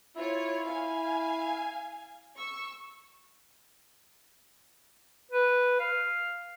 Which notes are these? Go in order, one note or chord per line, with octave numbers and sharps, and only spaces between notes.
E4 F4 C#5
F5 G#5
C#6 E6
B4
F5